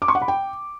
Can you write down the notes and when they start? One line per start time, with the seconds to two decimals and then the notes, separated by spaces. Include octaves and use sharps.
0.02 D6
0.08 C#6
0.15 F#5
0.22 B5
0.28 G5